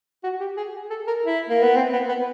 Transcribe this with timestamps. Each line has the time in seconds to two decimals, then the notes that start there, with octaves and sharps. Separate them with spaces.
0.24 F#4
0.40 G4
0.57 G#4
0.90 A4
1.07 A#4
1.25 E4
1.49 A#3
1.63 B3
1.76 C4
1.93 B3
2.09 B3